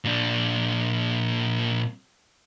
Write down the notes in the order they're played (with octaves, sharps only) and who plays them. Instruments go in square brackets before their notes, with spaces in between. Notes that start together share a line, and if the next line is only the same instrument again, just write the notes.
[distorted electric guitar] A#2 D4